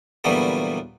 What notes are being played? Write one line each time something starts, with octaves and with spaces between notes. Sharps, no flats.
D2 A#2 E3 F#3 G3 B3